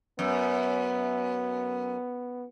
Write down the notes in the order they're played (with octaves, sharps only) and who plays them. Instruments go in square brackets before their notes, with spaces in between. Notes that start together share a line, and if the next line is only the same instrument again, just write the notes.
[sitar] F#2 [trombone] B3